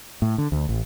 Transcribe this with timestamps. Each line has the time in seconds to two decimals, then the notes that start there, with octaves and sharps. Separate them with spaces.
0.22 A2
0.38 D3
0.52 D2
0.69 A1